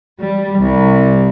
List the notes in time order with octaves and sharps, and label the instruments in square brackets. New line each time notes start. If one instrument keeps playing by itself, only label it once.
[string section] G3
C2